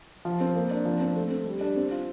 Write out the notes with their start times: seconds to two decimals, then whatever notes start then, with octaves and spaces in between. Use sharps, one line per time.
0.25 F3
0.40 C4
0.56 A#3
0.71 D4
0.85 F3
1.01 C4
1.16 A3
1.31 C4
1.46 G3
1.61 D4
1.76 C4
1.91 F4